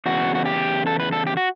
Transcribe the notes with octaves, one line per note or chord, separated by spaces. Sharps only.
E2 C#3 F#4
F#4
G4
A4
B4
A4
G4
F#4